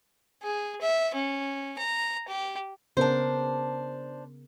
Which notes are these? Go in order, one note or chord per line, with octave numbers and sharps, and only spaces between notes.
G#4
E5
C#4
A#5
G4
C#3 B3 D4 A#4 C5